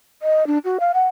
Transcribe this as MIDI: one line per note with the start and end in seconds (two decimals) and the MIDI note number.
0.22 0.46 75
0.47 0.58 62
0.65 0.78 66
0.80 0.92 77
0.94 1.07 78